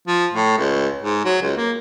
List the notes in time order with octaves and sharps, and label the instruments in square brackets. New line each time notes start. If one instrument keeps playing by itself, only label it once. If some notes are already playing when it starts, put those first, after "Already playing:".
[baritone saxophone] F3
A2
C#2
G#2
F#3
C#2
A#3